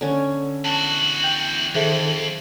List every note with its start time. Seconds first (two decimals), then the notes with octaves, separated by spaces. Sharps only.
0.01 D3 C#4
0.65 E2 F#4 A5 G7
1.24 G5 G6 F7
1.75 F2 D#3 G#4 A4 C5 E5